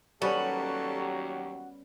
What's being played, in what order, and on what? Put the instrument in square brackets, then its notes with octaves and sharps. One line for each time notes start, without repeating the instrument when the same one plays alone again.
[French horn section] D#2 F#3 G4 [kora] G3 B3 C#4 [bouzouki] F#4 [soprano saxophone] A4